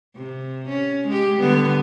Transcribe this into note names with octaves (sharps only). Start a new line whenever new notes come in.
C3
C#4
G#3 G4
D3 G3 B3